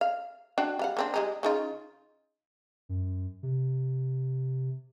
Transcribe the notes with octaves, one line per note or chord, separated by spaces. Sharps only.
F5
D4 F#4 G5
G3 F5 F#5
A#3 C4 D4
G3 G#3 D#4
C#3 D#4 F4
F#2
C3